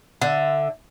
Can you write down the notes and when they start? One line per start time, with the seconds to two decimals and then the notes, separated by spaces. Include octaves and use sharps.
0.22 D3 E5